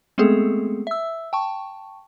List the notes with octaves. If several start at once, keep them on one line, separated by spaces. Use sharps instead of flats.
G#3 A3 B3 C4 G#4 A4
E5 E6
G5 A5 C#6